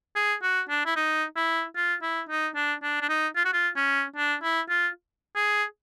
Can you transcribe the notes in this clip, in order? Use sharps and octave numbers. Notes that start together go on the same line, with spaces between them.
G#4
F#4
D4
E4
D#4
E4
F4
E4
D#4
D4
D4
D4
D#4
F4
F#4
F4
C#4
D4
E4
F4
G#4